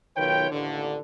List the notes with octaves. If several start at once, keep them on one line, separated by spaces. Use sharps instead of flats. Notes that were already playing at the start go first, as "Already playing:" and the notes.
B1 D#3 F4 B4 C#5 G5
A1 D#2 D3